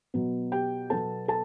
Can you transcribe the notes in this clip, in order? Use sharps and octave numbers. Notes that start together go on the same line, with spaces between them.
B2 F#3 B3
G4 G5
B2 F#3 B3 A4 A5
A4 A5